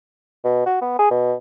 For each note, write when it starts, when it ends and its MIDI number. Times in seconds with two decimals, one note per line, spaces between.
0.44 0.63 47
0.66 0.77 66
0.81 0.97 59
0.99 1.09 68
1.11 1.34 47